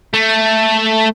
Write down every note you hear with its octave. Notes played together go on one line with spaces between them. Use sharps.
A3